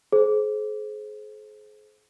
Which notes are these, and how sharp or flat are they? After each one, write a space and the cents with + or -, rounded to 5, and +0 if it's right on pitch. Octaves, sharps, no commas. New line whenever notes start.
G#4 +40 C5 +10